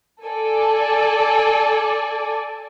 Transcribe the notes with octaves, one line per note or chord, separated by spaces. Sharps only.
A4 D5 G#5